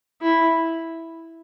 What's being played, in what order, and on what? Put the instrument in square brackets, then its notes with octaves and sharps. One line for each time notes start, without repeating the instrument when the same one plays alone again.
[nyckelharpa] E4